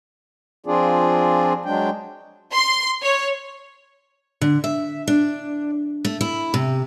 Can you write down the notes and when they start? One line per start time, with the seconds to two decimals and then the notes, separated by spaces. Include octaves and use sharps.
0.66 F3 C4 D4 F4 G#4 D5
1.65 F#3 G#3 D4 G5
2.53 C6
3.01 C#5
4.41 D3
4.64 E5
5.08 D4
6.05 A3
6.21 E4
6.54 C3